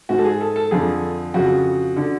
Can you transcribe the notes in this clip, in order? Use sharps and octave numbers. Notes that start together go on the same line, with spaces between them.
G#2 F#4
A4
G#4
A4
A4
F2 D3 G#4
F2 C#3 F#4
D3